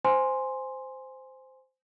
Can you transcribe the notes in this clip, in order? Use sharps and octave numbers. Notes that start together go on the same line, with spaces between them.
C5 G#5 C6